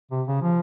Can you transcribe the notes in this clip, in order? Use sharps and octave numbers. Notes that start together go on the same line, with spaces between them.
C3
C#3
F3